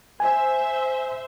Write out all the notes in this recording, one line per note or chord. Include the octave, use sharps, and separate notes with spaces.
C5 E5 G#5